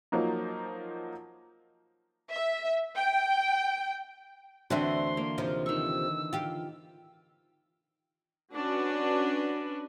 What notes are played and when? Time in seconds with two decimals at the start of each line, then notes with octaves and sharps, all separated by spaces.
0.12 F3 F#3 A#3 D#4
2.31 E5
2.96 G5
4.70 D2 D3 E3 C4 D4 F#4 E5 C6
5.17 A#3
5.38 D#2 C3 F3
5.66 D#3 C#6 E6
6.33 F4 G4
8.53 C#4 D4 F#4 B4